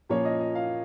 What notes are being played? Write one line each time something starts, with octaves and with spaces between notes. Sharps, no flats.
A#2 F3 A#3 C#4 C#5
D#5
D#5
F5